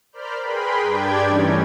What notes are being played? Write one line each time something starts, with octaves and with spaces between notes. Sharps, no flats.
A#4 C5 D5 B5 F6 G6
G#4 A#4 B4 G5 B5 C6
G2 D4 G4 D5 G5 G#6
E3 G3 A3 C#4 D#4